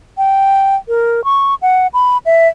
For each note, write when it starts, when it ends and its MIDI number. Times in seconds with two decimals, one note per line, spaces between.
0.18 0.76 79
0.88 1.24 70
1.24 1.55 85
1.62 1.87 78
1.94 2.18 83
2.26 2.48 76